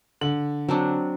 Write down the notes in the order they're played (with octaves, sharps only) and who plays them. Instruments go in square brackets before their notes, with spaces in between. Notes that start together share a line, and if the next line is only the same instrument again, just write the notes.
[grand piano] D3 F#7
[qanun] F#3 C4 D4